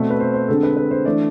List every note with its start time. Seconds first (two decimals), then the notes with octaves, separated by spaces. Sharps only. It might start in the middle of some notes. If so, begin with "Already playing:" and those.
Already playing: B2 A3 C4 D5
0.10 B4
0.20 C5
0.34 C5
0.48 D3 G#3 C4 A4
0.63 B4
0.77 B4
0.91 C5
1.05 E3 A3 D4 D5